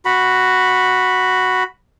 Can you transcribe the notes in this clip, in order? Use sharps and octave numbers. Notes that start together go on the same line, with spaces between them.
F#4 B5